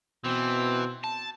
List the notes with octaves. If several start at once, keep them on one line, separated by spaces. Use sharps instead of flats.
B2 E3 C4
A5